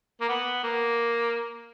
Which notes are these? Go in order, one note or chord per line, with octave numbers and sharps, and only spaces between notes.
A#3
B3
A#3